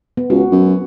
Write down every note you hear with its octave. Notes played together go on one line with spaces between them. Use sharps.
B3
C#2 F#4
F#2